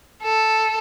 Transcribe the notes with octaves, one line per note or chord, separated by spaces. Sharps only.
A4